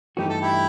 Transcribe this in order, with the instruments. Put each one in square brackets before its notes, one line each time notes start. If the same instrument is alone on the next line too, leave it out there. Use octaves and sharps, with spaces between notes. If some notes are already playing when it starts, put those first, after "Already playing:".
[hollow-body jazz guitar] G2 E3 A3 D#4 F#4 [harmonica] G4
[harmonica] A4
E4 G4